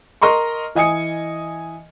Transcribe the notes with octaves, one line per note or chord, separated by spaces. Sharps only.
A#4 D#5 A#5 C6 C#6
E3 D#5 G#5 D#6 C#7